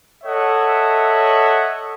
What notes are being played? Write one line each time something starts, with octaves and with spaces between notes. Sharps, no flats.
A4 C#5 D#5 E5 F#5